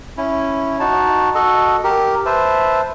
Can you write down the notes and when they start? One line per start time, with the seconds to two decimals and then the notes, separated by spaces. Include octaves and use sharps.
0.17 C#4 E4
0.80 D#4 F#4 A5
1.35 F#4 A4 D#5
1.84 G4 A#4
2.26 B4 C5 E5 A5